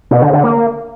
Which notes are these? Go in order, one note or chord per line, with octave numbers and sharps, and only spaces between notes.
B2
D3
D3
A#3